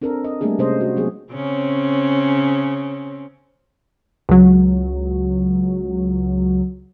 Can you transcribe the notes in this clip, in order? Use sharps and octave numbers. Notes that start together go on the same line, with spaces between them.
C4 D4 A4 A#4
D#5
G3 A3 A#3 D4 G#4
C3 G#3 A#3 C#4 C5 D#5
F#4
F#3 G#3 B3 G#4
C#3 C4 C#4
C#2 F#3